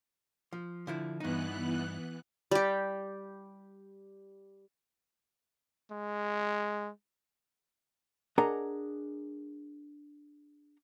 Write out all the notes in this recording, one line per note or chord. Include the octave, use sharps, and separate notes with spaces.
F3
D3 F3 E4
G2 E3 B3 D#4 F#6
G3 G4
G#3
D4 G#4 A#4 D#5 F#5 A#5